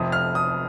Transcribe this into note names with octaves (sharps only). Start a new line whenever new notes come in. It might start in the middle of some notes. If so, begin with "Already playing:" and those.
Already playing: F1 F2 C3 F3 D#6
F6
D#6